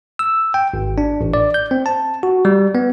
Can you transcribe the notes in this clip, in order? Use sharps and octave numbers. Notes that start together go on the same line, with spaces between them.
E6
G5
G#1
D4
A1
D5
G6
C4
A5
F#4
G3
B3